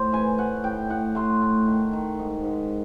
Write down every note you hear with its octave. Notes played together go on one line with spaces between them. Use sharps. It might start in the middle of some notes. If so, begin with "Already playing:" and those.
Already playing: A2 C5
E3 G#5
A3 F#5
A2 G5
A2 F#5
A3 C6
A3
D#3
D#3
G#2
G#2